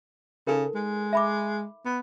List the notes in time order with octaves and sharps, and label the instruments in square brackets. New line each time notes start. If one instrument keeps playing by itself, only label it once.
[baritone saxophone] C#3 [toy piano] D#4 A4 A#4
[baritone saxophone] G#3
[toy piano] E5 B5 D6
[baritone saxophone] B3